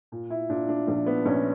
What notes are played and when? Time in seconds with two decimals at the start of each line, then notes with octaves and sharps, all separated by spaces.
0.12 A#2
0.30 E4
0.49 A#2 D4
0.69 D4
0.87 A#1 D4
1.06 B3
1.26 A#1 C#4